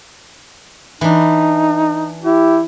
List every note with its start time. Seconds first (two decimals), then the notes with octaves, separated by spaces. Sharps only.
1.01 E3 D4 D#4
2.23 E4 G4